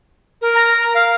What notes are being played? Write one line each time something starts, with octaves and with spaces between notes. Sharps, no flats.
A#4
A#5
F5